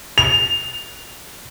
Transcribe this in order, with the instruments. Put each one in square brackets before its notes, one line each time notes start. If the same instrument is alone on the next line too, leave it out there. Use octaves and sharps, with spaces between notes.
[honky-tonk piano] F7